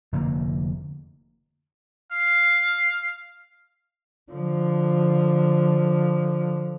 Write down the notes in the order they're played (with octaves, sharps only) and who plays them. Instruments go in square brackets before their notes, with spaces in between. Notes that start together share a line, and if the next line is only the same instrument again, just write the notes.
[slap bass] F1 D3 A#3
[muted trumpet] F5
[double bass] D3 F3